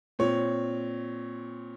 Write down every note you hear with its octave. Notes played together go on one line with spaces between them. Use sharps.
A#2 C4 C#5